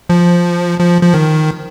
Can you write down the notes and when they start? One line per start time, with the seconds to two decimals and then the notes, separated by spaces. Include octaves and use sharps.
0.09 F3
0.80 F3
1.02 F3
1.14 D#3